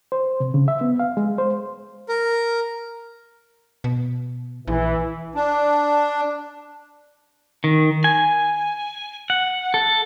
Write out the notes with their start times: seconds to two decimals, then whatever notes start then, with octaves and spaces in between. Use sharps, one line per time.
0.12 C5
0.40 C3
0.54 C#3
0.68 E5
0.81 B3
0.99 F5
1.17 G#3
1.38 C5
2.09 A#4
3.84 B2
4.67 A#1 E3
5.35 D4
7.64 D#3
8.04 G#5
9.30 F#5
9.74 A4